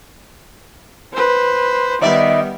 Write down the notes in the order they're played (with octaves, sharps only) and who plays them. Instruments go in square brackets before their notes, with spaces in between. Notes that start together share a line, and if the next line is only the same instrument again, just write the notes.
[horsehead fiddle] B4 C5
[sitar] D#3 D5 E5 [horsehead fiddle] G3 B3